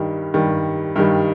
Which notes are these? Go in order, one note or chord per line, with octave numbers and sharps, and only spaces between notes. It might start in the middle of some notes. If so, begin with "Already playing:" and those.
Already playing: G2 D#3 G3
G2 D#3 G3
G2 D#3 G3